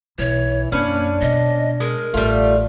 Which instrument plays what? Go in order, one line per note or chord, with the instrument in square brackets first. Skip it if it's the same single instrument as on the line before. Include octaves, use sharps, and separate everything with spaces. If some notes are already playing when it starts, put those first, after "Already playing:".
[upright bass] B1 [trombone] E3 [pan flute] C#5
[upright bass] F#2 [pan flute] A#3 [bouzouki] C#4 B4 [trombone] D4
[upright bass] B2 [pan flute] D#5
[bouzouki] G#3 [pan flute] A#4
[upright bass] A1 [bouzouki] G3 F4 [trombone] A3